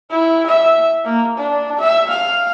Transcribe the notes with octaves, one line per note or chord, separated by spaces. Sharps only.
E4
E5
A#3
D4
E5
F5